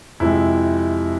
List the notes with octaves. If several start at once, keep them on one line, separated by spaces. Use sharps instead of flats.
F2 C3 G#3 E4